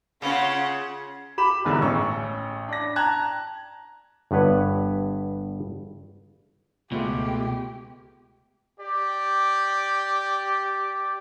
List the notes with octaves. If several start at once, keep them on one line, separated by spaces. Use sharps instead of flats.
C#3 C#4 F4 F#5
G4 B5 E7
E1 B1 G#2 D3 E3
A1 C#4 C#6 E6
D4 A#6
G5 A5 A#5 F#6 G#6
G1 G2 B3 B4 C#5
C#2 B2 G#3 A3 F4 G4
G4 D5